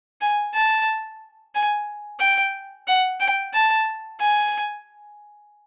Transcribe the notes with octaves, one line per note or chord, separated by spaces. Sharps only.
G#5
A5
G#5
G5
F#5
G5
A5
G#5